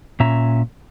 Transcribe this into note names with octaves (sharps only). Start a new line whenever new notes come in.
A#2 C#4 E5 A#5